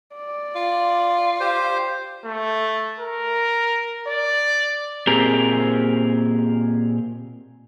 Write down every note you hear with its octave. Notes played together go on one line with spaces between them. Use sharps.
D5
F4
G4 C5
A3
A#4
D5
A#2 C4 G4 G#4 A#4